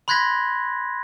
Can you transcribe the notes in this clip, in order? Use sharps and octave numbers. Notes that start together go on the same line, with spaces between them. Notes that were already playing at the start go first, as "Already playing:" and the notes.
B5 C6 F#6 G#6 A#6 B6